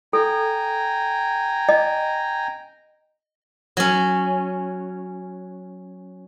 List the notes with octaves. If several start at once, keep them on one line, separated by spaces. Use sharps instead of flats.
A4 G5 G#5 A#5
D#5
F#3 C#4